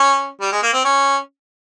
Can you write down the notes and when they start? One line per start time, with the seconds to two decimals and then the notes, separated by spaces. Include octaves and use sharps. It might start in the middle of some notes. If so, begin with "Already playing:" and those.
Already playing: C#4
0.41 G3
0.52 G#3
0.63 A#3
0.73 C4
0.84 C#4